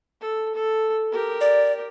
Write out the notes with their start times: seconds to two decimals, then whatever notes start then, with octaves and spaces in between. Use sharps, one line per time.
0.21 A4
0.55 A4
1.11 G4 A#4
1.41 D5